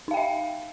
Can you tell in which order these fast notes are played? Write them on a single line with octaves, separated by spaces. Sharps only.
D#4 F5 G5 E5